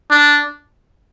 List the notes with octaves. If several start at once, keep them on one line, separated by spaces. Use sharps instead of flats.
D4